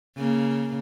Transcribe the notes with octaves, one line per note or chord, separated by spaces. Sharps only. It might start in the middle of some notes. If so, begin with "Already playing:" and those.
C#3 A#3